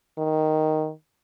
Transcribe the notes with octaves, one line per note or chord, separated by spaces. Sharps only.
D#3